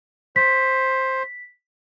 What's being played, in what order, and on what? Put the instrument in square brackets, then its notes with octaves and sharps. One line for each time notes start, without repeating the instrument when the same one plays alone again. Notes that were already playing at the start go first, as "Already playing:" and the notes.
[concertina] C5 [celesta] B6